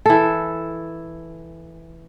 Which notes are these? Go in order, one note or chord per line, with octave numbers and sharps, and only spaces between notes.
E3 A4